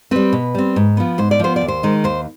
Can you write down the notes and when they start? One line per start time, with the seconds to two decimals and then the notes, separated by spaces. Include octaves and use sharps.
0.11 G3 C4 B4
0.33 B2
0.55 G3 C4
0.76 G#2
0.97 F3 B3
1.18 G#2 C5
1.31 D5
1.40 F3 B3 C5
1.56 D5
1.61 D#2
1.68 C5
1.83 D#3 G#3
2.04 D#2 C5